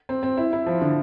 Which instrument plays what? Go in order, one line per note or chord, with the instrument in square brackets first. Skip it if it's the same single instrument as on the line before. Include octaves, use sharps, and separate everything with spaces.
[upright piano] C4
C4
E4
E4
F3
D3